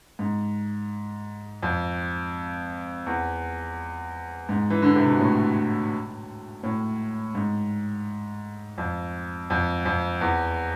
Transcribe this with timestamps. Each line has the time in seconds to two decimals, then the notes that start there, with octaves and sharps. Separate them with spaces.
0.19 G#2
1.63 F2
3.06 E2
4.49 G#2
4.70 E3
4.82 D3
4.96 C3
5.08 B2
5.20 A2
6.63 A2
7.35 G#2
8.78 F2
9.50 F2
9.85 F2
10.21 E2